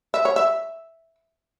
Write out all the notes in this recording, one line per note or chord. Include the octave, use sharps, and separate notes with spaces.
E5
C#5
E5